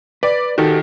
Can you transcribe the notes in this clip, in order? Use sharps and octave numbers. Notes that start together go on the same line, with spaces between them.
B4 D5
D#3 F#4 G4 A4